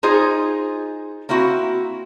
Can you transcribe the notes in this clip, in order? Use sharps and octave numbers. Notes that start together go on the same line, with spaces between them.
D#4 F4 G#4 C5 D#5
A#3 C4 E4 F#4